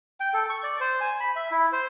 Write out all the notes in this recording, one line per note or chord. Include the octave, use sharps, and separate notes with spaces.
G5
A4
C#6
D5
C5
G#5
B5
E5
E4
C5